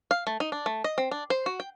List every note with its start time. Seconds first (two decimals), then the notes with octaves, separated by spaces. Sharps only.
0.11 F5
0.27 A3
0.40 D#4
0.52 D4
0.66 A3
0.84 D#5
0.98 C4
1.11 D4
1.30 C5
1.46 F#4
1.60 G5